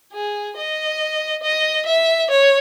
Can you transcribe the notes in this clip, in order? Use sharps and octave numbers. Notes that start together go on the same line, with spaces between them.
G#4
D#5
D#5
E5
C#5